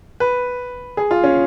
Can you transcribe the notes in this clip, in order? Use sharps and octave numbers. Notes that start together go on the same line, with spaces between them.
B4
G#4
F4
C#4